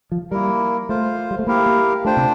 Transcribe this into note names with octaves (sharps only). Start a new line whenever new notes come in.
F3
G3 A#3 E4 A#4
A3 F4 C5 F5
G3
A3
A#3 E4 G4 A#4 F5
A#3
A3 D4 F4 C5 G5
C3